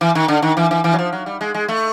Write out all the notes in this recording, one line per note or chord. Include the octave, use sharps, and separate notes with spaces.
E3
D#3
D3
D#3
E3
E3
E3
F#3
F3
F#3
G3
G#3
G#3
A3